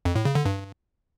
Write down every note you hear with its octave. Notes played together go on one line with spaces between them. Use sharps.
F2
A2
C#3
D3
G2